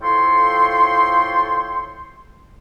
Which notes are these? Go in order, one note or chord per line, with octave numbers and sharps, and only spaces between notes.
A2 F3 A4 C#5 G5 C6